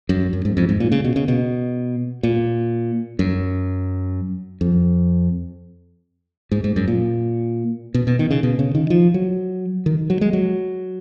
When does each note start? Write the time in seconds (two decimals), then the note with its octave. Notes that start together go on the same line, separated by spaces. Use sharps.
0.09 F#2
0.33 F#2
0.45 G#2
0.57 F2
0.69 G#2
0.80 A#2
0.92 C#3
1.05 B2
1.16 C#3
1.28 B2
2.23 A#2
3.19 F#2
4.61 F2
6.52 G#2
6.64 G#2
6.76 F#2
6.88 A#2
7.94 B2
8.07 B2
8.19 D#3
8.31 C#3
8.43 B2
8.59 C#3
8.75 D#3
8.90 F3
9.14 F#3
9.86 D#3
10.10 F#3
10.21 G#3
10.33 F#3